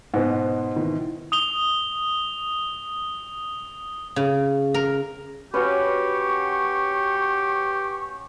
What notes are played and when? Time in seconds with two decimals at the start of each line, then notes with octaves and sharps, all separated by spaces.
0.14 G#2 B2 C5 F#5
0.76 D#3 E3
1.32 D#6 F7 G7
4.16 C#3
4.74 A#4
5.54 C#4 F#4 G4 B4 C#6